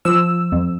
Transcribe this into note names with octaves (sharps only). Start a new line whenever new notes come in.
F3 E6
F2